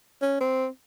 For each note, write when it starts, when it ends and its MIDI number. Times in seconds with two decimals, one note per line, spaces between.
0.22 0.36 61
0.40 0.67 60